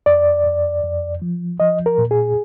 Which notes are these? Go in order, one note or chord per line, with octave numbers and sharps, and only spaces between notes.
F2 D5
F2
F2
F3
F3 D#5
A#4
A#2
G#4